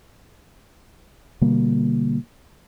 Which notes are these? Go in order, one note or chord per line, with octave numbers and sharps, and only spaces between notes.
B2 D3 G3 A#3